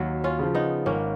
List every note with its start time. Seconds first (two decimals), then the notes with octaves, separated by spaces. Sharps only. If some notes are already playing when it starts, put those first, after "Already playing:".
Already playing: D#2 F#3
0.24 C#4 F4
0.39 C#3 F3
0.54 B3 D#4
0.86 G#1 A#3 C#4